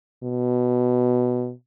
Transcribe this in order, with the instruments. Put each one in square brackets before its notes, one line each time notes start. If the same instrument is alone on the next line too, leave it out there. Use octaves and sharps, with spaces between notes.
[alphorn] B2